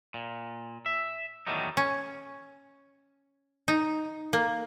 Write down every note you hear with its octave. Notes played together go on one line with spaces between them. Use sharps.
A#2
E5
E2 D#3 F#3 G3 A3 D#4
C#4
D#4
A#3